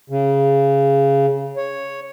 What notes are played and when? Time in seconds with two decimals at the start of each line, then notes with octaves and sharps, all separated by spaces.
0.10 C#3
1.57 C#5